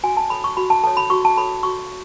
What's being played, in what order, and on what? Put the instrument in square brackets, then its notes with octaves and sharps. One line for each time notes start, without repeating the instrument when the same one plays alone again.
[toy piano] F#4 G#5
A5
A4 C#5 B5
C#6
F#4 B5
A5
A4 A5
C#5
B5
F#4 C#6
A5
A4 C#5 B5
F#4 C#6